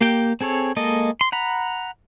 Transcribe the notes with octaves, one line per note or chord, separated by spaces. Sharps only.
A#3 G4 G5
C4 G#4 A4 C#5
G#3 A#3 A4 D#5
C6
F#5 A#5 B5